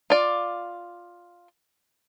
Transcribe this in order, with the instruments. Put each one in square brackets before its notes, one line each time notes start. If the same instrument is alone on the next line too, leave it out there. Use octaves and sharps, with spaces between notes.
[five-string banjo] F4 D5